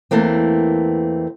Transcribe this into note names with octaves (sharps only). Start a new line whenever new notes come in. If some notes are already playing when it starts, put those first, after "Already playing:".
E2 E3 A3 A#3 C4